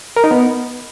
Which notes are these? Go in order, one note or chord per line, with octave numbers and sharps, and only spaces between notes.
A#4
D#4
B3